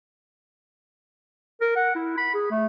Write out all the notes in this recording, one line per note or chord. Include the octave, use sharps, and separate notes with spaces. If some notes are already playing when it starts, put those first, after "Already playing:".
A#4
F#5
E4
B5
G#4
A3